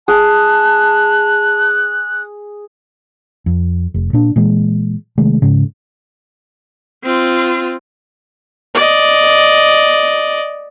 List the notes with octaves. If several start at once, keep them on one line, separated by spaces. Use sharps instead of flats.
G#4 A5 F#6
F2
F1
A#2 D4
A#2 E3 G#3
C3 D#3 G#3 A3
G#2 C#3
C4 F4
D5 D#5